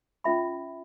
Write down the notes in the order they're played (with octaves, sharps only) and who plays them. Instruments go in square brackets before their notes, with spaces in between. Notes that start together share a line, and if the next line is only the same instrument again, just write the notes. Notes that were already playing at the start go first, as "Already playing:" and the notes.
[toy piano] C#4 F4 E5 B5